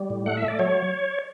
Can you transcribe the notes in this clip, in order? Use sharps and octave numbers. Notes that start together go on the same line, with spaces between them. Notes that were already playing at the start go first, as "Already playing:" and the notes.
Already playing: G3
A2
A3 F#5
E5
A3
D5
F#3 C#5